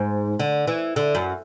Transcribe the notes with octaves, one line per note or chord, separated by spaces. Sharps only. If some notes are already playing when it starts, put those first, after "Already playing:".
Already playing: G#2
D3
E3
D3
F#2